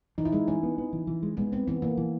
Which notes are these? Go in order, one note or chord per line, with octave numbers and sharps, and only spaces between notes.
E3 D#4
E4
G#3 D#4
E3 C#4
B3
B3
E3
E3
G#3
G#3 B3
B3 C4
E3 B3
E3 A#3
E3